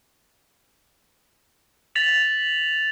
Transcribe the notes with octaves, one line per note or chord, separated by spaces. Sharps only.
A6 B6 F7 F#7